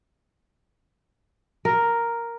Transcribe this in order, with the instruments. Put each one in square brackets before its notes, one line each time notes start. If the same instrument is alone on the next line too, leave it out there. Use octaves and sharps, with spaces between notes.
[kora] A#4